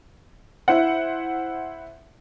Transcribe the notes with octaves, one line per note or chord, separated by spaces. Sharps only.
E4 C5 F#5